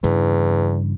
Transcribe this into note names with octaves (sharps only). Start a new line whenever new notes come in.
E2 G2 C#3 E3